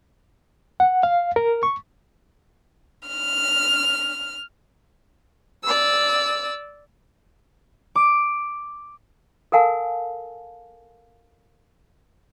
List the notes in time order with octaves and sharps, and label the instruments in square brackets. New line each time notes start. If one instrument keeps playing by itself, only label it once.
[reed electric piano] F#5
F5
A#4
C#6
[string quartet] F6
D5 E6
[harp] D6
[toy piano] A4 A#4 F5 G#5 A5